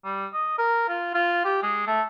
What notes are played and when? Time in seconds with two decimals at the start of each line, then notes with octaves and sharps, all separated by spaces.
0.05 G3
0.33 D#5
0.58 A#4
0.89 F4
1.15 F4
1.45 G4
1.63 G#3
1.87 A3